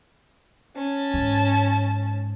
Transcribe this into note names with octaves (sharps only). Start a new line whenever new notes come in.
C#4 A5
G#2